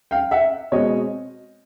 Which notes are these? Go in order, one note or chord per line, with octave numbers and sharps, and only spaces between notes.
F5 G5
E5 F#5
B2 G#3 C4 C#5 D#5